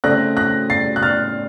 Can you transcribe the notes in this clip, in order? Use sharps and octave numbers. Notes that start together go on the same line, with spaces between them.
C#3 A3 C4 F#6 A#6
F#6 A#6
A6 C7
F#6
F6 A6